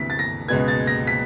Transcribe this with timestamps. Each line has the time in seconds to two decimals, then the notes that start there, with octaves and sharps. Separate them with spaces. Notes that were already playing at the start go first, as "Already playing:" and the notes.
Already playing: D2 C3 E3 A3 B6
0.10 A6
0.19 A#6
0.48 C#2 B2 G#3 B3 G#6
0.68 A6
0.87 A#6
1.07 B6